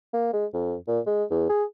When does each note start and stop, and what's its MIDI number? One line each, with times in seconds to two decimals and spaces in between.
0.14 0.32 58
0.33 0.46 56
0.54 0.75 41
0.88 1.00 46
1.06 1.24 56
1.31 1.46 40
1.49 1.64 68